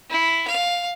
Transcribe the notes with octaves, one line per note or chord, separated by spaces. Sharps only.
E4
F5